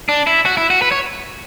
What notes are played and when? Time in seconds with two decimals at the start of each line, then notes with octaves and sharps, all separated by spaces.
0.09 D4
0.27 E4
0.46 F#4
0.57 E4
0.70 F#4
0.82 B4
0.92 C#5